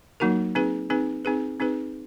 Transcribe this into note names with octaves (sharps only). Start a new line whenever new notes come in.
F#3 A#3 D#4 F#4 A#4
C4 D#4 G#4 B4
C4 D#4 G#4 B4
C4 D#4 G#4 B4
C4 D#4 G#4 B4